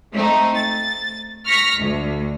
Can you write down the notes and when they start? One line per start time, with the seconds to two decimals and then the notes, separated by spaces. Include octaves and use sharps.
0.13 A3 C4 D#4
0.55 A6
1.46 C#6 F6 A#6 B6 C#7
1.78 D2